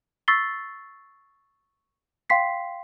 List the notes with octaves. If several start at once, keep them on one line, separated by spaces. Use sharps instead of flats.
C#6 E6 A6 B6 C7 G7
F5 G5 C6 B6 C7